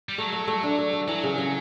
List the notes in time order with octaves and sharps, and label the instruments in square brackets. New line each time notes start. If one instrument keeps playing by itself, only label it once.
[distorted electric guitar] G3
[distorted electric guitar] F#3 [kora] A3
[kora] A3
A3
D4
A3
A3
[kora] E3 [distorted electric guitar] F#3
[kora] C#3
C#3